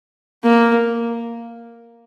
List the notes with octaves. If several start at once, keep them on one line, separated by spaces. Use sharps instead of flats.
A#3